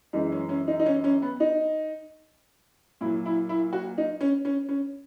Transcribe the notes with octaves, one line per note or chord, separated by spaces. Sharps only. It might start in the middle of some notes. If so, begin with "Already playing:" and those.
F#2 E3 G#3 D#4
C#4
C#4
D#4
D#4
C#4
C#4
B3
D#4
A#2 F#3 E4
E4
E4
F#4
D#4
C#4
C#4
C#4